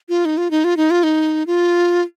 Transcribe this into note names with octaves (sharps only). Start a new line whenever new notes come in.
F4
D#4
F4
D#4
F4
D#4
F4
D#4
F4